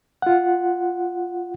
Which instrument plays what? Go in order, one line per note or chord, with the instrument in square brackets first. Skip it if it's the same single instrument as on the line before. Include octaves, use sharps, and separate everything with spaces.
[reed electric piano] F4 F#5